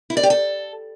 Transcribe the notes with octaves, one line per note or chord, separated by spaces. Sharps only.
E4
D5
G4
A4